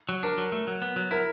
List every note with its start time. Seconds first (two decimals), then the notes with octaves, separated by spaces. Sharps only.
0.09 F#3
0.23 D4 A#4
0.38 F#3
0.52 A3
0.67 F#3
0.82 B3
0.96 F#3
1.11 E4 A#4